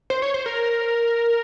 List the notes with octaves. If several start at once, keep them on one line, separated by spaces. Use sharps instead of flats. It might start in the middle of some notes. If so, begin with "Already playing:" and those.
C5
C#5
C5
A#4